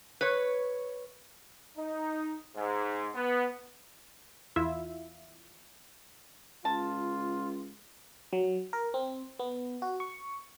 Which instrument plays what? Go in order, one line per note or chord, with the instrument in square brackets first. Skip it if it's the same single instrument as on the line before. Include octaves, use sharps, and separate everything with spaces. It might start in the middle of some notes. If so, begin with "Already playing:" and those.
[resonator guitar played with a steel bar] B4 C#5
[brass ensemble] D#4
G#2
B3
[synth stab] E2 E4 F4 E5
[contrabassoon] C#2 [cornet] F4 [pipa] A5
[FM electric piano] F#3
A#4
C4
B3
F#4
C#6